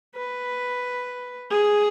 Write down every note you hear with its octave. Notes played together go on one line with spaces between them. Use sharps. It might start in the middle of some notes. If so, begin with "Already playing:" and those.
B4
G#4